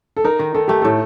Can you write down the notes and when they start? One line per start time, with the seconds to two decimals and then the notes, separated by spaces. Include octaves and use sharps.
0.17 A4
0.24 D#4 A#4
0.39 D#3
0.55 D#3 A4
0.68 A3 G4
0.82 A2 A4